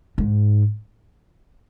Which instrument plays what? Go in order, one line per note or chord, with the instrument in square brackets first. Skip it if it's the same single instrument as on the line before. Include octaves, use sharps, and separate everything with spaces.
[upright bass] G#2